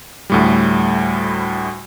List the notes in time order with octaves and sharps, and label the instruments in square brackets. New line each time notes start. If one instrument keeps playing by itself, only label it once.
[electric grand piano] D2 A2 G3